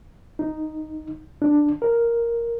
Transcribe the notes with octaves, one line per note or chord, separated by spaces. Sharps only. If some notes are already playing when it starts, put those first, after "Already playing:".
D#4
D4
A#4